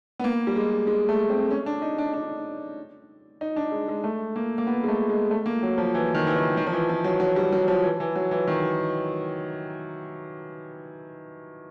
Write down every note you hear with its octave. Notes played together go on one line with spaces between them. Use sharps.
B3
A#3
G3
G#3
G#3
A3
C4
C#4
D4
D#4
D4
D4
D#4
D4
G#3
G#3
A3
A#3
A#3
B3
G#3
A3
G#3
A3
A#3
F#3
F3
E3
D#3
E3
D#3
D#3
F3
E3
F3
F#3
F#3
G3
F#3
F3
E3
E3
F#3
E3
D#3